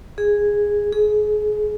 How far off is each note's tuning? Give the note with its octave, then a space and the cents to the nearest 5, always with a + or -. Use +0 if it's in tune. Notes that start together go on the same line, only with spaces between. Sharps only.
G#4 -10
G#4 +25